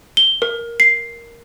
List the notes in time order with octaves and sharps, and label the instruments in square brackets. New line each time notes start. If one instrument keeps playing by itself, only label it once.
[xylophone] G7
A#4
C7